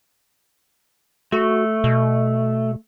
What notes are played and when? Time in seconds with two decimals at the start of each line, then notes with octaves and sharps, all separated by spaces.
1.32 A3 F#4
1.84 B2